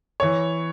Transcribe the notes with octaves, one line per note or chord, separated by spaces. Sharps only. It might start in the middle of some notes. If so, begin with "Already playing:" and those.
E3 C#5